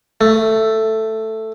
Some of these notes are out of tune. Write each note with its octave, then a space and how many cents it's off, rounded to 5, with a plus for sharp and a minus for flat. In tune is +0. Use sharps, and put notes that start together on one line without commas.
A3 +5